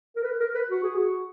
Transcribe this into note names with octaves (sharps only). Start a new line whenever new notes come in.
A#4
B4
A#4
B4
F#4
G#4
F#4